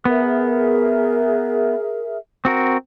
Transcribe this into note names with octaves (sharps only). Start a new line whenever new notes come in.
B3 G#4 A#4 E5
C4 F#4 A#4